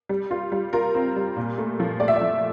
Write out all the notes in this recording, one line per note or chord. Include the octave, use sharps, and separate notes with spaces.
G3
F4
G3
F4 A#4
C4
G3
A#2
A3
F3
A3 D5
E5
D5
F3